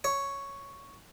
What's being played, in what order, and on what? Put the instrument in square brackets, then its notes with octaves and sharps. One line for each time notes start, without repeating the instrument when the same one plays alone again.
[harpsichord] C#5